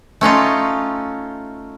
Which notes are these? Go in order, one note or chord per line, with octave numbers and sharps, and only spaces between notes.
A3 C#4 D#4 F4